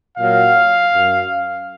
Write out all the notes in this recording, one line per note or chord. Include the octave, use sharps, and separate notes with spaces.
A#2 F#3 F5
F#2